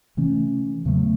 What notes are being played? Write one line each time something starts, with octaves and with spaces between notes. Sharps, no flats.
C3 E3 A3 C#4
E2 C#3 F#3 A3